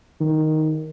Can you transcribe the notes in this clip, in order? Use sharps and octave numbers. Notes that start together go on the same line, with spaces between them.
D#3